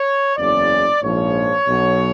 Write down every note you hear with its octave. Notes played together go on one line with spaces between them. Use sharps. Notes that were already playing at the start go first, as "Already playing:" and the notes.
Already playing: C#5
F#1 E2 C#3 D5
A#1 G#2 F3 C#5
B1 B2 F#3